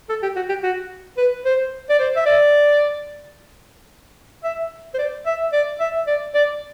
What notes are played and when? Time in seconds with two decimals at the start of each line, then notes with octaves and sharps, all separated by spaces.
0.09 A4
0.22 G4
0.36 F#4
0.49 G4
0.63 F#4
1.17 B4
1.45 C5
1.89 D5
1.99 C5
2.16 E5
2.26 D5
4.44 E5
4.94 C5
4.98 D5
5.26 E5
5.53 D5
5.80 E5
6.07 D5
6.35 D5